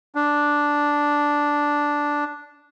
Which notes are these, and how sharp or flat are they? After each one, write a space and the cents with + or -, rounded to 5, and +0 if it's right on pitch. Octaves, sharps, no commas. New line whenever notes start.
D4 -5